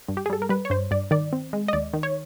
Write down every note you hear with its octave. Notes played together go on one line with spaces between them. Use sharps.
G2
G4
G#4
G3 A4
A#4
G3 B4
C#5
G2 C5
G2 D5
D#3 D5
C4
G#3
D#5
D#2 D5
D#3
C#5